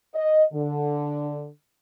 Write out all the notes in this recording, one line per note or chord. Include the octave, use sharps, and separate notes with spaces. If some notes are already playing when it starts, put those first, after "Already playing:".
D#5
D3